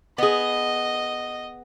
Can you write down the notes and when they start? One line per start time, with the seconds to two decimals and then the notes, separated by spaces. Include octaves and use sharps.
0.18 B3 G#4 D#5